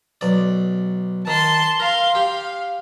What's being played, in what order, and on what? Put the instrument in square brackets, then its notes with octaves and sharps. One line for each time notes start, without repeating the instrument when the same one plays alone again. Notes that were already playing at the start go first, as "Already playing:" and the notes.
[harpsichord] B1 D5
[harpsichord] D#3 [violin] A5 C6
[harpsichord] A#4 [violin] F5 C6
[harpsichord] G4 [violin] F5